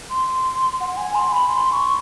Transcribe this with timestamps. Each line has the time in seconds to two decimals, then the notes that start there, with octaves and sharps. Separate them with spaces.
0.10 C6
0.80 F#5
0.97 G#5
1.15 C6
1.32 B5
1.49 C6
1.72 C#6